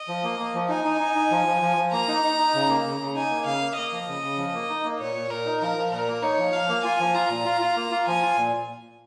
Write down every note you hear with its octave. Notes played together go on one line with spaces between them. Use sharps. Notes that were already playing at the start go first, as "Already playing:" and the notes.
Already playing: D#5
F3
A#3
A#3
F3
D#4 G#5
D#4
D#4
D#4
F3
F3
F3
F3
A#3 A#5
D#4
D#4
D#4
C#3
A#3
C#3
C#3
D#4 G#5
A#3
C#3 F5
A#3
A#3 D#5
F3
C#3
C#3
F3
A#3
D#4
A#3
A#2 C#5
A#2
A#2 A#4
D#4
F3 A#4
F3
A#2 A#4
A#3
D#4 C#5
F3
F3 F5
A#3
F4 G#5
F3
F4 A#5
A#2
F4
F4
A#3
F4
F3 G#5
F4
A#2